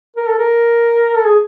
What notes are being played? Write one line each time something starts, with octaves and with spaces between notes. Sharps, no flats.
A#4
A4
A#4
A4
G#4